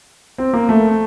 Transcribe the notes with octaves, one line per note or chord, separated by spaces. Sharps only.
C4
A#3
A3